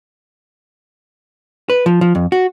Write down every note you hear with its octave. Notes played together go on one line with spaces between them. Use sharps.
B4
F3
F3
F2
F#4